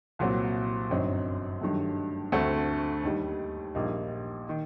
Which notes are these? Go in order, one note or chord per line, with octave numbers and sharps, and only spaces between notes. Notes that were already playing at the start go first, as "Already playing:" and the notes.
C2 A#2 F#3 C4 F#4
G1 F#2 F#3 C4 D#4
G2 D#3 F#3 A3
D2 D3 A3 C4 F#4
D#2 D#3 G3
A#1 A#2 G3 A#3 D#4
D#3